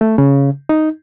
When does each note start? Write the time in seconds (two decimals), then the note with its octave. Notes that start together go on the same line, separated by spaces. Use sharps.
0.01 A3
0.18 C#3
0.69 D#4